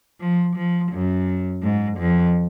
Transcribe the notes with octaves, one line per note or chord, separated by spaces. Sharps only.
F3
F3
F#2
G#2
F2